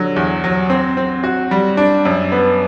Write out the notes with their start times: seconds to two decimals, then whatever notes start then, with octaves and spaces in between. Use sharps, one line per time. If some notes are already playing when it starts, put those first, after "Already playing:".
Already playing: D3 F#3
0.16 E2
0.44 F#3
0.70 C4
0.97 C4
1.24 F#4
1.51 G3
1.77 D4
2.05 F#2
2.32 B3